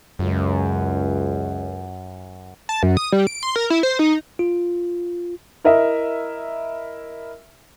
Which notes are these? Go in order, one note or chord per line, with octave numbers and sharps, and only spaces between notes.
C#2 F#2
A5
F#2
D#6
G3
D7
C6
A#4
E4
C5
D#4
F4
E4 A#4 D#5 E5